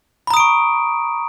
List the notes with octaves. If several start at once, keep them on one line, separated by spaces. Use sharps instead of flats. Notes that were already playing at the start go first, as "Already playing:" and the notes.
A#5 B5 C#6 D#6 D7